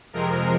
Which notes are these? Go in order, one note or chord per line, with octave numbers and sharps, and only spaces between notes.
F2 C3 F3 G#3 A#4